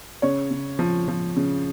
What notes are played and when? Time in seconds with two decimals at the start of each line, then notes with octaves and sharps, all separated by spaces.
0.22 C#3 C#5
0.51 C#3
0.79 F3
1.08 F3
1.37 C#3